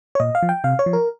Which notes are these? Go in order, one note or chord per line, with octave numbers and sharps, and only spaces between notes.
C#5
A#2 D#5
F5
F3
G5
C3 F5
C#5
F3
A#4